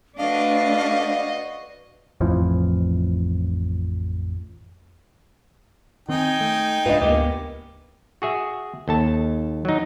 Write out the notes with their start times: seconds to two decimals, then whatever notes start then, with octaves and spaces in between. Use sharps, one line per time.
0.18 A3 D4 F#4 B4 C5 D5 D#5 F5
2.21 A1 F2 E3 F3
6.09 D#3 C4 D#4 G5 G#5
6.41 A3
6.86 C#2 G#2 D4 E4 F4 B4 D#5
7.02 D2 A#3 B3 G4
8.22 F#4 G#4 E5
8.88 D#2 A4 A5
9.65 F#3 D#4